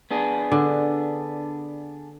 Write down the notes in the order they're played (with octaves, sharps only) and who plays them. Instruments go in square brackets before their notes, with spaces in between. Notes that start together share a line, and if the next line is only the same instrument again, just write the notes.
[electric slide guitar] B3 D4 G#4
[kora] D3